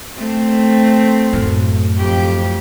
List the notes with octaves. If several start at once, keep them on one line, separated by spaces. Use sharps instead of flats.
A3 C4
F#2 A2
F2 G4